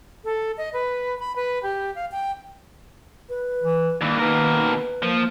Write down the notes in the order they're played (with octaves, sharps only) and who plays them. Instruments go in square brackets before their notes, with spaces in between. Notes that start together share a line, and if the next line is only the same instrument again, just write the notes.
[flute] A4
D#5
B4
B5
B4
G4
F5
G5
B4
[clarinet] E3
[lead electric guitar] G2 E3 [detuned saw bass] D#3 [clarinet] A#3
[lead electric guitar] B2 A#4 [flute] B4
[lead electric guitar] F3 [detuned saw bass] A#3